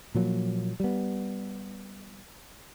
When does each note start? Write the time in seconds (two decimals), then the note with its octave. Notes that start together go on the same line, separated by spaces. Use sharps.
0.15 A#2 F3 F#3 A#3
0.80 G3 B3